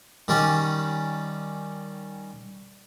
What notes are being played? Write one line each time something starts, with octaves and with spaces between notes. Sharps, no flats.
D#3 G3 C#4